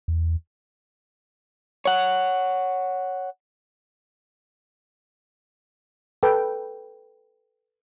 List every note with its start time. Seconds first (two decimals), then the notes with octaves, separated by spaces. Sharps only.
0.08 E2
1.85 C#5 F#5
6.23 A4 B4 G5